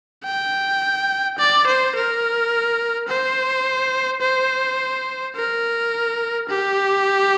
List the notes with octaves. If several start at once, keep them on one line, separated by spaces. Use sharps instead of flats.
G5
D5
C5
A#4
C5
C5
A#4
G4